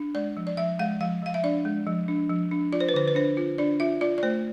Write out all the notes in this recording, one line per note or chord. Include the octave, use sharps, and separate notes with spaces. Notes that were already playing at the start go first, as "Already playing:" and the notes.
Already playing: D4
G#3 D5
F3
D5
F3 E5
G#3 F5
F3 F5
F3 F5
E5
D4 D5
G#3
F3
D4
F3
D4
F4 D5
C5
B4
D3 C5
B4
D4 C5
F4
D4 D5
F4 E5
F4 D5
D5
A3 C5